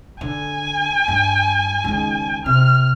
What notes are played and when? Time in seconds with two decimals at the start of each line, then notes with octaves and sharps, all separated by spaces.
0.21 D3 G#5
1.08 G2
1.84 C#2 D#3
2.46 C3 F6